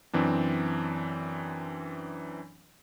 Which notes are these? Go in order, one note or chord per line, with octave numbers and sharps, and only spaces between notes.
F#2 E3 C4 D4